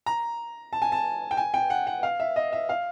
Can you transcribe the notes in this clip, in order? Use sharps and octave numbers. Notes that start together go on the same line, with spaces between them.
A#5
A5
G#5
A5
G5
G#5
G5
F#5
F#5
F5
E5
D#5
E5
F5